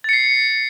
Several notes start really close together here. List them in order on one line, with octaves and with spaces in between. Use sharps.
A6 C#7 C7